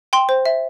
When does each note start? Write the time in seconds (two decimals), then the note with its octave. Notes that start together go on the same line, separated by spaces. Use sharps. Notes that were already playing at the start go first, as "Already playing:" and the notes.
0.13 G5 C6
0.29 C5
0.46 E5